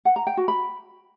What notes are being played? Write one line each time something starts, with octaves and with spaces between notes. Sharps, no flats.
F#5
A#5
G5
F#4
B5